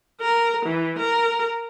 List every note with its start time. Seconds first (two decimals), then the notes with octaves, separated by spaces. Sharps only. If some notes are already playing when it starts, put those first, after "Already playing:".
0.21 A#4
0.66 E3
0.99 A#4